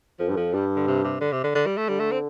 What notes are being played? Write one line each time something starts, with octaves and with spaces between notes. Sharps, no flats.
F2 F3
G2
F2 F3
G2 G3
D3
C3
C3
D3
C3
D3
D3
G3
A3
D3 G3
A3
C4